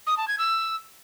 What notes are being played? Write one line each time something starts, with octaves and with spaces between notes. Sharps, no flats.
D#6
A5
G#6
E6